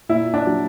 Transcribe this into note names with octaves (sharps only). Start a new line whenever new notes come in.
A#2 E4
D4
F#3